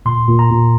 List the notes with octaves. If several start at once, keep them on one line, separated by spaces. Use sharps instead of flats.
A#2 C6
A#2
A#5
A#2